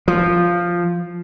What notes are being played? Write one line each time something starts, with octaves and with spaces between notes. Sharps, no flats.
F3